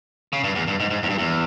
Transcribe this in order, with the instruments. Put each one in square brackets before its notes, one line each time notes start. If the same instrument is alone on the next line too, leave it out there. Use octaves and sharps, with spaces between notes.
[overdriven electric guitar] C#3
G2
E2
G2
G#2
G#2
E2
G2
E2